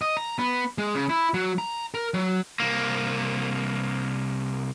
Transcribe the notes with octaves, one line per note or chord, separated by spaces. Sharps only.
D#5
A#5
B3
G#3
C#3
E4
F#3
A#5
A#4
F#3
C2 A#3